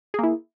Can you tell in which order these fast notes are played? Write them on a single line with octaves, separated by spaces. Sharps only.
G#4 A#3 E4